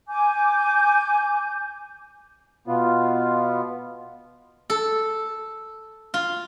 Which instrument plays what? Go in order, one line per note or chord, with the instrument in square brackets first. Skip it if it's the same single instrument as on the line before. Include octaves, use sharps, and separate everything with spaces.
[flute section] G#5 D6 G6
[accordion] B2 B3 F4
[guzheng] A4
F4